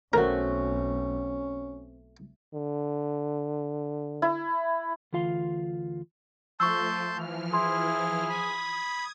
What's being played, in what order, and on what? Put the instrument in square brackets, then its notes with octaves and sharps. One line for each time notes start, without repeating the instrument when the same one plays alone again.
[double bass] B1 [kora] A3 C4 F#4 [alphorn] C#4 [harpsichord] A#4
[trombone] D3
[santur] E4
[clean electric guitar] D2 E3 F4 F5 C6
[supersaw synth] F3 A3 [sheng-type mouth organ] A5 C6 G6 [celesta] C#6 E6
[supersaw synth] E3 F3 F6
[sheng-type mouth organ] E4 [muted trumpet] G#4 [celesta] C6
[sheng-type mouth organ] B5 [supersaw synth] D#6 G#6